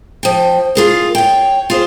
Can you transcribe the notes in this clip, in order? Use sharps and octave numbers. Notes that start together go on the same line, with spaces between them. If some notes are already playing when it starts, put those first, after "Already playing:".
F3 G5
F4 G#4 A#4
C#5 G5
F4 G#4 C5